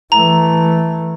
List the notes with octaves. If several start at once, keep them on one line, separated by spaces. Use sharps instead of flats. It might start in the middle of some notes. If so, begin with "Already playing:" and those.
E3 A3 A#5